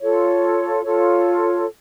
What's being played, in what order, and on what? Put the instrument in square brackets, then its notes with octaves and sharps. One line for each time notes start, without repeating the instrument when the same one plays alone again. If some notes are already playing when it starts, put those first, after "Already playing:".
[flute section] F4 A4 C#5
F4 A4 C#5